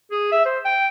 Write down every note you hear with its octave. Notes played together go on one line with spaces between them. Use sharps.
G#4
E5
C5
G5